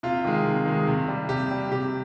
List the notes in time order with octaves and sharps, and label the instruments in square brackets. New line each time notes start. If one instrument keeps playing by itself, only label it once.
[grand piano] C3 F4
D#3 G#3
C3
D#3 G#3
C3
G3
C3 G4
G3
C3 G4